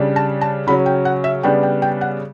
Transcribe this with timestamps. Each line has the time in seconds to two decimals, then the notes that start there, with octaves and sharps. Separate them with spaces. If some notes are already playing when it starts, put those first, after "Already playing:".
Already playing: C#3 G3 D4
0.16 A5
0.41 A5
0.67 C#3 F#3 C#4 B5
0.86 G5
1.05 F#5
1.24 E5
1.43 C#3 G3 B3 D4 G5
1.63 G5
1.82 G5
2.01 F#5